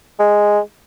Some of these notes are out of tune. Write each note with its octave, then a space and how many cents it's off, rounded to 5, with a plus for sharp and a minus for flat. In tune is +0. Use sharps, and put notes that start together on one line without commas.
G#3 -5